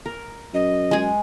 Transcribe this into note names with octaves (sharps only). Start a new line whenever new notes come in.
A#4
F#2 D#5
G#3 G#4